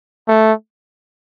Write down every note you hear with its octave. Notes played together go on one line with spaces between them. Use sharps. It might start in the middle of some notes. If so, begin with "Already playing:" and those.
A3